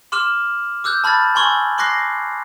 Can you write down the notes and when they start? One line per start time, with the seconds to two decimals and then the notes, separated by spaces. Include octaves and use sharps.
0.12 C6 D6 F6 E7 F#7
0.84 D6 E6 F#6 G6
1.04 A5 B5 F6 G#6 A6
1.35 G#5 C6 C#6 E6 G#6 F#7
1.78 C6 D6 F#6 A#6 C7